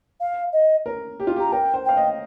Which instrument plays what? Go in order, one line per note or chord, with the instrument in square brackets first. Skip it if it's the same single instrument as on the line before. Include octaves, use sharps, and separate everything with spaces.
[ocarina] F5
D#5
[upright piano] A#4
G4
F4
[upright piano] G4 [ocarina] A#5
[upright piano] A#4 [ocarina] G5
[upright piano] C5
[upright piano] F5 [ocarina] G5
[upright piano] D#5